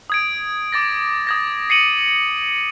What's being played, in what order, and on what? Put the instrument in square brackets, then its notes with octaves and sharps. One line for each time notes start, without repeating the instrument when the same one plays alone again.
[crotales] D#6 G#6 D7
D6 A6 A#6
D#6 G#6 A#6
C7 C#7 D#7 F#7